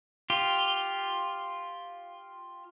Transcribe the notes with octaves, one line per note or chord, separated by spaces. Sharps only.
F4 G4